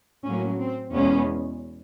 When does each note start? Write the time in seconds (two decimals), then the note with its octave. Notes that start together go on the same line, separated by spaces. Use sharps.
0.24 A2 F#3 A#3 C#4
0.59 C4
0.93 E2 B2 G#3 B3 C#4